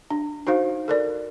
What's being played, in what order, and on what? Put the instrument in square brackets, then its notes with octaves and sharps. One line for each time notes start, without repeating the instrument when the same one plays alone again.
[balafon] D4
D#4 F#4 C5 F5
A4 A#4 D5